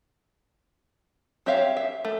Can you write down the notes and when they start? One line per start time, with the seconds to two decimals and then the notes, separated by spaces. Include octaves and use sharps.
1.46 C4 G4 C#5 E5 F5
1.77 E5
2.05 A3